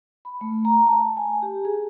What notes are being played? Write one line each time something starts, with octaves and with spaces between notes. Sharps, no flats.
B5
A3
A#5
A5
G#5
G4
G#4